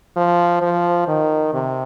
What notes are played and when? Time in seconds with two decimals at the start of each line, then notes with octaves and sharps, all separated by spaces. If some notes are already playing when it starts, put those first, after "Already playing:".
0.17 F3
0.62 F3
1.07 D#3
1.53 C3